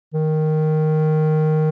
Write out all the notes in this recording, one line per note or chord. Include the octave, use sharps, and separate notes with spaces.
D#3